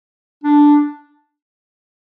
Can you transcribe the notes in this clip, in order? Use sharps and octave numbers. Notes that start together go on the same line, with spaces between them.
D4